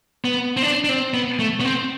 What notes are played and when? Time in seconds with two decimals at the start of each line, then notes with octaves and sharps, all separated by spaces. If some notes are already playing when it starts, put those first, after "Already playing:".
0.24 B3
0.57 C4
0.62 D4
0.84 D4
0.89 C4
1.14 B3
1.39 A3
1.61 B3
1.65 C4